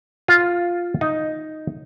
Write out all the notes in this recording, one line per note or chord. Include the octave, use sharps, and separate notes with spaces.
F4
D#4